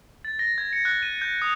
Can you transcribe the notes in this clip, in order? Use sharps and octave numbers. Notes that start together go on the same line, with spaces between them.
A6
A#6
G#6
C#7
F#6
D#7
G6
D#6